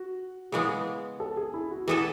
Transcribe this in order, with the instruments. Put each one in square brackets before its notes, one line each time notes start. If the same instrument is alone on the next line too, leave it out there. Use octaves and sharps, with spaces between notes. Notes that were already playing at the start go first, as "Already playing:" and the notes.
Already playing: [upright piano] F#4
[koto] C#3 E3 G#3 B3 [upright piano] G#4
[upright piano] A4
G#4
E4
F#4
[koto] E3 B3 E4 A4 [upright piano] G#4